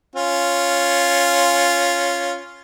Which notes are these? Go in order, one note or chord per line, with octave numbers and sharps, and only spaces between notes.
C#4 F4